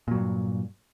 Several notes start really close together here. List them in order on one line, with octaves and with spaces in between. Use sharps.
A#2 F#3 G2